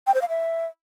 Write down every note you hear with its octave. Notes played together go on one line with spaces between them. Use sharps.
G5
C5
F5
E5